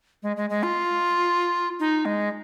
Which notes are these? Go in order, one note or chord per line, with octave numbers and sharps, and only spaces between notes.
G#3
G#3
G#3
F4
D#4
G#3